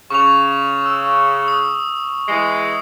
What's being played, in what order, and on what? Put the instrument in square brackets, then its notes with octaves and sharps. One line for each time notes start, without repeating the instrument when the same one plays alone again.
[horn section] C#3 [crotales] C#6 F7
[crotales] E6
D#6
[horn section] E3 G#3 [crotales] C7